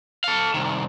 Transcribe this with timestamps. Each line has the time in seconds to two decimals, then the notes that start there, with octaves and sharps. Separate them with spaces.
0.24 A4 F5
0.54 C2 D#3